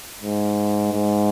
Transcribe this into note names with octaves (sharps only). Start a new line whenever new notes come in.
G#2
G#2